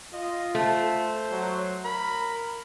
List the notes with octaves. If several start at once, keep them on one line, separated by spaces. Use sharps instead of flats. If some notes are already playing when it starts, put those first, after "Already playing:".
F4 D#5
A3 C5
F#3
A#4 B5